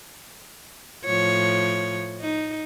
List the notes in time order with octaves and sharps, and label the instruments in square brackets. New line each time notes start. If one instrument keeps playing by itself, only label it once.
[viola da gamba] A2 F3 C#5
D#4